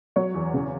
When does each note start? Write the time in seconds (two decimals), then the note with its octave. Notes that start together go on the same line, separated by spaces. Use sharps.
0.16 F#3 C#5
0.35 E2
0.54 C#3